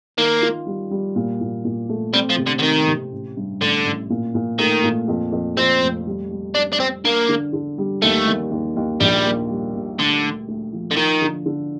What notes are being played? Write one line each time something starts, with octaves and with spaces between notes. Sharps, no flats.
D#3 A#3
F4
G3
G3
A#2
A#2
A#2
A3
G3 C4
F3
C3
D3
D3
D#3 C4
C3
A1
G2
A1 D3
A1
A#2
A#2
D#3 A3
A#2
F2
F2
F2 C4
F1
G3
G3
G3 D4
D4
G3 C4
A#3 D4
D3
D3
G3
D#2 A3
D#2
D#2
D#2
A#1 G3
A#3
G3
A#2
D2 D3
D2
D2
F3
D3
D#3 F3
D3
D3